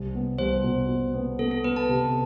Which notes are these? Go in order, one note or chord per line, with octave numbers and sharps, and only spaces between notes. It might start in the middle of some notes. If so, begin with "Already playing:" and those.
Already playing: C2
B3
C2 C5
B2
B2
B3
B3 A4
A4
B3 B4
A5
C3